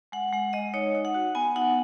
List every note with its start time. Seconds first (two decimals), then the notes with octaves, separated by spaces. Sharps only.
0.12 G#3 F#5
0.33 G#3 F#5
0.53 G#3 D#5
0.74 D#4 C#5
0.95 D#4
1.05 F#5
1.14 F#4
1.35 B3 G#5
1.56 D#4 F#5